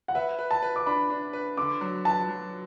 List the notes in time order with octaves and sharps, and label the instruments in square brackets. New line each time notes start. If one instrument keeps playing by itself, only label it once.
[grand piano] F#5
[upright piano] B4 [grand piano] E5
[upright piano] B4
[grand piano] A5
[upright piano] B4
[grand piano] D6
[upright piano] D4 [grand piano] B5
[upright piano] D4
B4
[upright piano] D3 [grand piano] D6
[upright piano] F#3
[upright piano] B4 [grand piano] A5
[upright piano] F#3